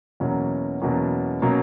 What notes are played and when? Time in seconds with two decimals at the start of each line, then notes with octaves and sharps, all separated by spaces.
0.20 E2 B2 F#3 A#3 C#4
0.82 E2 B2 F#3 A#3 C#4
1.42 B2 F#3 A#3 C#4